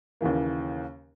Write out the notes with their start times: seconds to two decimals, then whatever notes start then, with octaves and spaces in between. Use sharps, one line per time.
0.21 D#2 C#3 E3 A#3